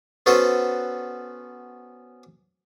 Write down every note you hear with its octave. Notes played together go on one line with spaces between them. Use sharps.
B3 C#4 F#4 A4 B4 C5